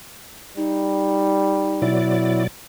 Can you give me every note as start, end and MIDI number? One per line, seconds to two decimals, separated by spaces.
0.57 1.93 55
0.57 1.88 63
1.82 2.47 47
1.82 2.47 54
1.82 2.44 64
1.82 2.47 74